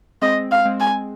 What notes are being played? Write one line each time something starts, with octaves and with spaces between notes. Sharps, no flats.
G#3 C4 D#5
F5
G#3 C4
G#5